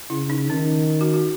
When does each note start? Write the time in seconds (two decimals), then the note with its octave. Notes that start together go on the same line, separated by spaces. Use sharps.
0.10 C#3 E4
0.30 D#4
0.50 D#3 C#4
1.01 F#4
1.14 F#4